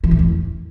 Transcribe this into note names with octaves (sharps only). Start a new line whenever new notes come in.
E3
A2
E2